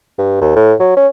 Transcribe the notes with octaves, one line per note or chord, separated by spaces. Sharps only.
G2
D#2
A2
F#3
C#4